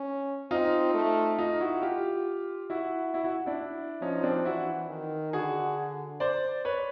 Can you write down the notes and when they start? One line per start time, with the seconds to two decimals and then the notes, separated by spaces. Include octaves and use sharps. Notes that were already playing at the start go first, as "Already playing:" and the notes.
Already playing: C#4
0.50 C4 D#4 F4
0.94 A3
1.38 D#4 F4
1.60 E4 F#4
1.82 F4 G4
2.70 E4 F#4
3.14 E4 F#4
3.24 E4 F#4
3.46 D4 E4
4.01 F3 C#4 D#4
4.23 C4 D4
4.45 E3 E4 F#4
4.89 D#3
5.33 D3 F#4 G#4
6.20 C5 D5
6.65 B4 C#5